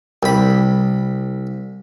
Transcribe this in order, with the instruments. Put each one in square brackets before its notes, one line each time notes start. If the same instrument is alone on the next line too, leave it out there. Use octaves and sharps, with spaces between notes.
[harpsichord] C2 B5